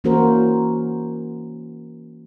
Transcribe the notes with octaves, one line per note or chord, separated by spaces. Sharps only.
E3 A#3 C#4 F#4 A#4 C5